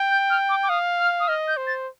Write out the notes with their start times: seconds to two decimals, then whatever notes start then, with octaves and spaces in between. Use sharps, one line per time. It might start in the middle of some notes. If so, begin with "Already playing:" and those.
Already playing: G5
0.11 G6
0.30 F6
0.49 D6
0.63 D6
0.69 F5 D#6
0.99 F6
1.20 D#6
1.28 D#5 F6
1.48 G6
1.57 C5
1.67 A6